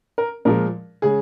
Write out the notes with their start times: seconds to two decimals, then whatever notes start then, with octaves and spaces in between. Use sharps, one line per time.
0.18 A#4
0.45 A#2 F3 G#3 A#4
1.02 C#3 G#3 G#4